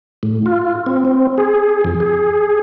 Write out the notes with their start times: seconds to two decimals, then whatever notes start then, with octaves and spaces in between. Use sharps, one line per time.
0.23 A2
0.46 F4
0.86 C4
1.05 C4
1.38 G#4
1.85 F2
2.00 G#4